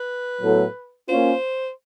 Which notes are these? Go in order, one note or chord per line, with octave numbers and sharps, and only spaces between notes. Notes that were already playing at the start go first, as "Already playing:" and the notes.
Already playing: B4
A2 F#3 B3 E4 A4
A#3 C#4 F4 C5